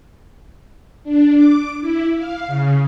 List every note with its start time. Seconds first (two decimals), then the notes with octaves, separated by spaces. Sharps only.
1.04 D4
1.34 D6
1.81 E4
2.16 F5
2.47 C#3